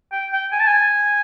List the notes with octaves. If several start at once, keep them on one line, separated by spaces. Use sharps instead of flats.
G5
G5
G#5
A5
G#5